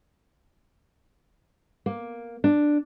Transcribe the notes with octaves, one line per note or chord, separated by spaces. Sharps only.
A#3
D4